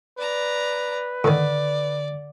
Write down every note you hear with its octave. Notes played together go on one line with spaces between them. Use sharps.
B4 D5 A#5
A2 D3 D#3 D5